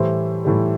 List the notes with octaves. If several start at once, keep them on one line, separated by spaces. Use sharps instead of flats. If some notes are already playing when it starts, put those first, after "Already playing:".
Already playing: A2 E3 G3 C5
A2 E3 G3